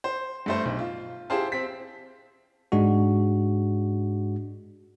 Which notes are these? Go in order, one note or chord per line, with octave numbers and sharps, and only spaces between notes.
C5
G2 A3 C5
B1
F4
E4 G4 G#4 C5 F5 A5
C4 B6
G#2 G#3 D4 F#4